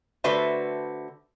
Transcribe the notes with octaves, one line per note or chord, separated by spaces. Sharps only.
D3 A3 F#4 B4 C5 E5